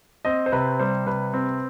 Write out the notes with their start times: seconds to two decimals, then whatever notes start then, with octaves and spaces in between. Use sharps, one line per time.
0.25 C4 D#5
0.46 C5
0.52 C3 B4
0.79 G3 C5
1.06 C3 B4
1.34 C4